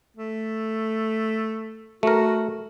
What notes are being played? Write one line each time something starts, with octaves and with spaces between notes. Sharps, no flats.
A3
A3 F#4 A#4